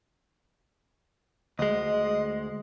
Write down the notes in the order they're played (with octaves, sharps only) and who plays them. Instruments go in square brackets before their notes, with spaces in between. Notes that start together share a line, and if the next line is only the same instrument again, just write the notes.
[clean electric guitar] D2 G#3 [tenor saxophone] D#5